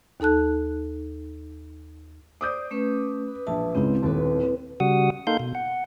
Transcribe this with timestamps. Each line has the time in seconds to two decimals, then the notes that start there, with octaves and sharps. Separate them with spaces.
0.20 D#2 D#4 A4 A5 F#6
2.41 C5 D5 D6 D#6 G6
2.71 A3 C#4 B4
3.27 B4
3.47 E1 A#1 E5 A5
3.75 C#2 G#2 C#3 C4 E4 C5
4.03 D#1 D#2 D4 B4
4.80 C#3 G3 F#4 F#5 D#6
5.27 A#3 D#4 A4 F5 C6 G6
5.40 B2
5.55 F#5